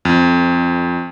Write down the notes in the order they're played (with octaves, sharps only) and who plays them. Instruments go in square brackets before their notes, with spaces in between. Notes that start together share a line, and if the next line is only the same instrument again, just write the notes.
[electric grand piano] F2